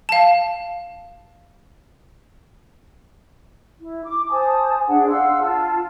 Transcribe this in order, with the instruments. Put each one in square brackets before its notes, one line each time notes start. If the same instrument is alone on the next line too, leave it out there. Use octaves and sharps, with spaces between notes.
[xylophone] F5 A5
[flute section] E4
D6
C5 G#5 A5 D#6
D4 G#4 F#5
F5 F#5 C6 E6
F4 A5